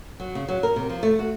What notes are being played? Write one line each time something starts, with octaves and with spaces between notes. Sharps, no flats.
F#3
C#3
F#3
A#4
C3
F3
A3
F#4